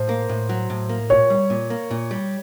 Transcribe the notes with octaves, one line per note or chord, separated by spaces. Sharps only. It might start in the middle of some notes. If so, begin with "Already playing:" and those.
Already playing: A2 C5
A#3
A2
F#3
A2
A#3
A#2 C#5
G3
A#2
A#3
A#2
G3